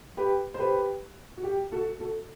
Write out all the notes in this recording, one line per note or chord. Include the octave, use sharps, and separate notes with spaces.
G4 B4
C5
G4 B4
F#4
G4
F#4 A4
F#4 A4